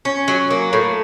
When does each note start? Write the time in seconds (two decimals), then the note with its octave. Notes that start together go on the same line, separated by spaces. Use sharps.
0.05 C#4
0.28 F#3
0.51 A#3
0.73 A2